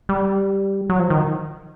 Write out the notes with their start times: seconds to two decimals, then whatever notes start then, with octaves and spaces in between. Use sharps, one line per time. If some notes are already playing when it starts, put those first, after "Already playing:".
0.09 G3
0.89 F#3
0.99 F3
1.10 D#3